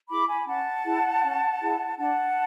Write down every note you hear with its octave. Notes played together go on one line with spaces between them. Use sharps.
E4 G#4 B5 D6
G#5 B5
C#4 F#5 A5
E4 G#4
C#4
E4 G#4
D4 F#5 A5